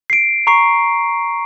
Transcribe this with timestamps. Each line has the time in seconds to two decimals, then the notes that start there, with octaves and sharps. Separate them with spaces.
0.10 C7 D7
0.47 A#5 C#6 C7